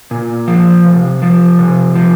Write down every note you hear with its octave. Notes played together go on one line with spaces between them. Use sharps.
A#2
F3
C3
F3
C3
F3